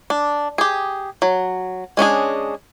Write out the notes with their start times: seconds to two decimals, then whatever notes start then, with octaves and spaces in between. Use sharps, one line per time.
0.10 D4
0.58 G4 G#4
1.22 F#3
1.97 G#3 C#4 D4 G#4